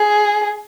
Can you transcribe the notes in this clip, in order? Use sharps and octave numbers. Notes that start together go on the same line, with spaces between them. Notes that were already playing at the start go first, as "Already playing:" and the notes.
Already playing: G#4